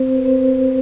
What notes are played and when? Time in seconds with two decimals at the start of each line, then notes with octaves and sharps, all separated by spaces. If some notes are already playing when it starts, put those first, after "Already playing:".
Already playing: C4 C5
0.15 B4
0.25 C4 C5